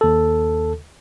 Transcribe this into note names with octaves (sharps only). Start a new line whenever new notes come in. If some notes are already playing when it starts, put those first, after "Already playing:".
D#2 A4